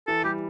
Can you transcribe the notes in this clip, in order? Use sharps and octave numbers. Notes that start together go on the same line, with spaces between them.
E3 A4
G3 G4